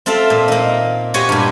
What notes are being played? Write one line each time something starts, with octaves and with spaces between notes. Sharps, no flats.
C4 F4 A4 E5 F5
A#2
A#3 D#4
F#4 G4 C5 C#5 F#5 G#5
G2 A#2